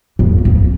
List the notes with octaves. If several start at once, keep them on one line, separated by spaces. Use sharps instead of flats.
F2
F2